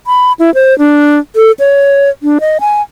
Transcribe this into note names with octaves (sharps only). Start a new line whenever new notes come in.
B5
E4
C5
D4
A4
C#5
D4
D#5
G#5